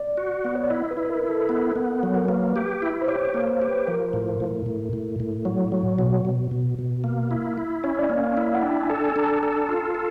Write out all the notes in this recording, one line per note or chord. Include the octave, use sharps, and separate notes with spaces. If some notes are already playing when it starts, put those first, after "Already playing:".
Already playing: D5
F#4
B3
C#5
D5
E4 D#5
B4
E4
B4
A#4
E4
A4
B3
B3
F#3
A#4
A#3 B4
G4
E4
C5
G4 C#5
C#5
A#3
C5
G4
B4
F3 A#4
A2
A2
A2
A2
A2
F#3
F#3
B2
B2
B2
B2
A#3
E4
E4
C#4 C#5
D5
D#5
A#3
F5
E4
F#5
D4 G5
G#5
A4
G#5
D4 A#5
A5
A4
F4
A4